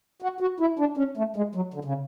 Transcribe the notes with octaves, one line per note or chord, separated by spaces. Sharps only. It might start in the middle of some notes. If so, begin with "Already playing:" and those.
F#4
F#4
E4
D4
C#4
A3
G#3
F#3
D3
C#3